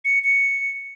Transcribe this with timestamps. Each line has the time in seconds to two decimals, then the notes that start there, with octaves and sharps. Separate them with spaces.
0.05 C#7
0.24 C#7